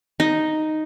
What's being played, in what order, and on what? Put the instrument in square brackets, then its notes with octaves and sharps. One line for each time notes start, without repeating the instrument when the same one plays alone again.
[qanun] D#4